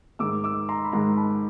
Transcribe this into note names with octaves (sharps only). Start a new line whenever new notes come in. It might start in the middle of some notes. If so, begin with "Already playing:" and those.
G#2 D#3 G#3 D6 E6
D6 E6
A#5 C6
B5
G#2 D#3 G#3 A#5 C6
A5 B5